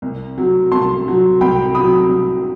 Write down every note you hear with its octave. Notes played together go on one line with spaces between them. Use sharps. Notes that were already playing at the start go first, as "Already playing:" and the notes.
C2
C3 F#3
C2 A5 C6
C3 F#3
C2 G5 B5
C3 F#3 B5 D#6
C2